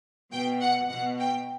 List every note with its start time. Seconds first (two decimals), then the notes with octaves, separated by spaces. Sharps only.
0.33 B2 G5
0.62 F#5
0.90 B2 F#5
1.19 G5